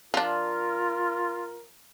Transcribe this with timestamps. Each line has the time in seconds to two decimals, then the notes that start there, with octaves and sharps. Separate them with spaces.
0.14 F3 D4 F4 A#4